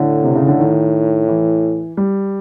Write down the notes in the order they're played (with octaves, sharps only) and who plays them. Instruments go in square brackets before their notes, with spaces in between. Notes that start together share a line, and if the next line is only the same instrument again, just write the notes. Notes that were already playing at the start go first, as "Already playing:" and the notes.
Already playing: [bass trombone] A2 [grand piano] D3
[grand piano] C3
C#3
D3
D#3
E3
G3